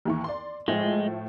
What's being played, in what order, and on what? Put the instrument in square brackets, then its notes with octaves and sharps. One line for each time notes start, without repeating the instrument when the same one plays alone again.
[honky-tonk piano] D#2 E3 C#6
D5 C6
[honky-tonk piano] A2 F3 A3 [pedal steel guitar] G#3